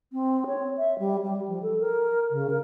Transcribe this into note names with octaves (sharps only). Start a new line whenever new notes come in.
C4
C#5
E5
G3
G3
F3
A4
A#4
C#3
A#4